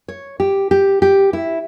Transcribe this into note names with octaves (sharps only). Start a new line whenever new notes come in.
C#5
G4
G4
G4
E4